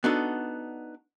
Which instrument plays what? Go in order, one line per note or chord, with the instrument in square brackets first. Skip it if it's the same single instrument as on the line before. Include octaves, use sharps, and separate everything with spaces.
[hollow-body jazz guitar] B3 D4 D#4 F#4 A4